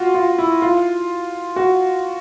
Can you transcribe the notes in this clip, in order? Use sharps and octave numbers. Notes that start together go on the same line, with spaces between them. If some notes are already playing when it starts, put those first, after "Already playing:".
Already playing: F4 F#4
F4
E4
F4
F#4